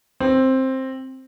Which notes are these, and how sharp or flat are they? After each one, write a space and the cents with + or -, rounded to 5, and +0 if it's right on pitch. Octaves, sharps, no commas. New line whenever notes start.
C4 +10